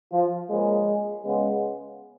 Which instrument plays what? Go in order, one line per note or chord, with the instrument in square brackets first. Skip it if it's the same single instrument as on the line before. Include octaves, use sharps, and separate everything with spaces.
[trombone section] F3 F4
C#3 F3 G#3 A#3 G#4
C#3 G#3 B3